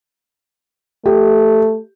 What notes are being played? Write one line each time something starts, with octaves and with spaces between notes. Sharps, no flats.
A3 G4